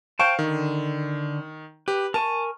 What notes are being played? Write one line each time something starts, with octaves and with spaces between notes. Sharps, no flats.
C5 F5 G5 A5 C#6
D3 D#3
G4 B4
A#4 G#5 A5 C#6